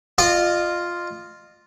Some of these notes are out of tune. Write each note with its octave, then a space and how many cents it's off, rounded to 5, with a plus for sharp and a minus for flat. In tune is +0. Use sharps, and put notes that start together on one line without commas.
F4 +0 D#5 -35